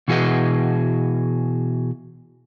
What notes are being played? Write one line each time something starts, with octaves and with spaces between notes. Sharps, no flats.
B2 E3 F#4 G#4 B4 D#5